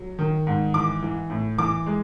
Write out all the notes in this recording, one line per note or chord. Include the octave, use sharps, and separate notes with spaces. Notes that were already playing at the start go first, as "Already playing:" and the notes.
Already playing: F#3
D#3
G#2
E3 D6
E3
A2
E3 D6
G#3